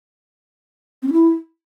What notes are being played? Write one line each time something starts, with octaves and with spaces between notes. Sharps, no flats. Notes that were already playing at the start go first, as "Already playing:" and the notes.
C4
C#4
E4